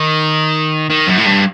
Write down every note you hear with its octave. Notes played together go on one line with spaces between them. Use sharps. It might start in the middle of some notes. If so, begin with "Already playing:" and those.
Already playing: D#3
D#3
F#2
A2
G2